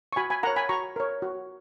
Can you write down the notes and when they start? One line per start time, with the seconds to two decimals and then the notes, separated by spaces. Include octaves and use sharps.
0.13 C#6
0.16 F#4 G#5 B5
0.30 G#5 B5
0.43 A#4 C#5 F#5 A#5
0.56 G#5 B5
0.69 F#4 A#5 C#6
0.96 A#4 C#5
1.22 F#4